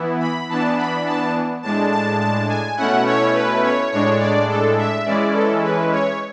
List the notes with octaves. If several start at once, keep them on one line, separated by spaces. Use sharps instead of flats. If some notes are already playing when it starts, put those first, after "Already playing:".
Already playing: E3 B3 E4
B5
E3 B3 D4 A5
B5
A5
A2 G#3 D4 A5
A5
A5
G#5
B2 A3 C#4 E4 F#5
C#5
B4
C#5
A2 G#3 D4 C#5
D5
A4
E5
E3 G#3 C#4 E4 D5
A4
B4
C#5